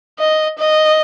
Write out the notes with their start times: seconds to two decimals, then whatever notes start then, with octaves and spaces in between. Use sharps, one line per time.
0.19 D#5
0.59 D#5